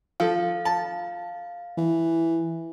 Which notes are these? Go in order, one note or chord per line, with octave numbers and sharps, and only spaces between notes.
F3 A4 F5
A5
E3